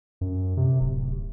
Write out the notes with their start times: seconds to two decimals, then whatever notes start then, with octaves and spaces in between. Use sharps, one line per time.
0.21 F#2
0.57 C3
0.81 D1